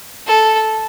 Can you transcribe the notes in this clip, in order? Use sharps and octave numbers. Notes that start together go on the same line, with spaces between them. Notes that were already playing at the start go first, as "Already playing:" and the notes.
A4